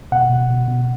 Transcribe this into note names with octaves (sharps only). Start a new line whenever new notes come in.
B2 F#5
B2
B2
B2